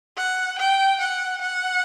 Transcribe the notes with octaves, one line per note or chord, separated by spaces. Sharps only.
F#5
G5
F#5
F#5